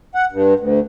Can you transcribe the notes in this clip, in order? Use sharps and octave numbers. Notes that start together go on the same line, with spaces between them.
F#5
G2
D2